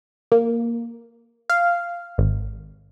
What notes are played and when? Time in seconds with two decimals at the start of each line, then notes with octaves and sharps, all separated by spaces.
0.32 A#3
1.50 F5
2.18 G#1